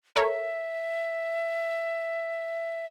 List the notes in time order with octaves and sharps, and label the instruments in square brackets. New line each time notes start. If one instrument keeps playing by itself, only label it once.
[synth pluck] A4 A#4 C#5 [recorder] E5